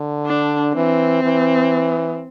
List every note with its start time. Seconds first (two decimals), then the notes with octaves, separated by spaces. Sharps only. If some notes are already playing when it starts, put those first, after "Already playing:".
Already playing: D3
0.26 D4
0.75 E3 C4
1.23 E3